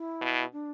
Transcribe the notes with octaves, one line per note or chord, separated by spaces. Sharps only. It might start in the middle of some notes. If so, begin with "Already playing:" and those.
Already playing: E4
B2
D4